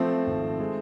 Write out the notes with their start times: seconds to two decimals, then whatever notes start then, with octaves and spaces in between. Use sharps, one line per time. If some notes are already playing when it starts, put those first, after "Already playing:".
Already playing: F3 A3 C4
0.27 G#1
0.60 G#3